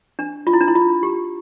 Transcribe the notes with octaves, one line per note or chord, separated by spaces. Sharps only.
D4
F4
E4
D4
E4
F4
G4